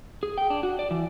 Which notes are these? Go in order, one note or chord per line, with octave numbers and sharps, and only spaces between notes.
G#4
G5
D4
F#4
D5
E3